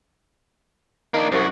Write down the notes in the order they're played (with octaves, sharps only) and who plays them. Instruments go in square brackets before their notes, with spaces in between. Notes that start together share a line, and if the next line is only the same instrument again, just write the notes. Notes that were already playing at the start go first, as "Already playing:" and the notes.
[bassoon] D#3 [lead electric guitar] A#3 D4
[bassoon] C2 [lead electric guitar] F#2 F#4